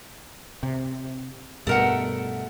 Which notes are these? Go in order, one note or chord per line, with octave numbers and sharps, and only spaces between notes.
C3
G2 B2 A3 A#4 F#5